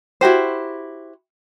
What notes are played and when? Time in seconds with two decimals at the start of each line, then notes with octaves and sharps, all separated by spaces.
0.21 E4 F#4 G4 C5